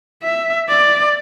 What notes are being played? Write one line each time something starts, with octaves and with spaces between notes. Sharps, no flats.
E5
D5